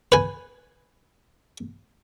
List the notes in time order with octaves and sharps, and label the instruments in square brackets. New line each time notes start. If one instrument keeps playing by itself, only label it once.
[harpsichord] B4 G#5